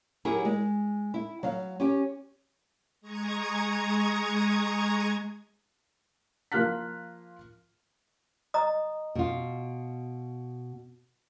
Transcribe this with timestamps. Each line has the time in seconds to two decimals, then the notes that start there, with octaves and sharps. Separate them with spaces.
0.25 F#3 E4 G4 G#4 A#4 C#5
0.45 G#3
1.14 E4
1.43 F#3 F5
1.80 C#4 G4
3.01 G#3 A#5 C#6 D#6 G#6
6.52 F3 A#3 F4 F6 F#6 B6
8.54 D#5 A#5 D#6
9.15 B2 F4